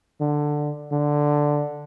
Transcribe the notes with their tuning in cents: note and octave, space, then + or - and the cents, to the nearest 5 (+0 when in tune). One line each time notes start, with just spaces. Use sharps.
D3 +10
D3 +0